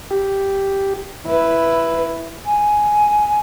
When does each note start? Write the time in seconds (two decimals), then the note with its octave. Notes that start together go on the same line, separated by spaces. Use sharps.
0.11 G4
1.26 E4 B4
2.45 G#5